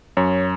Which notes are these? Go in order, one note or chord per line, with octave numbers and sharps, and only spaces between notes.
F#2 C#5